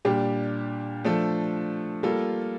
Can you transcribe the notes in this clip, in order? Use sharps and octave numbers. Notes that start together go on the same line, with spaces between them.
A#2 G3 D4 G4
F3 A3 D4 A4
G3 A#3 F4 A4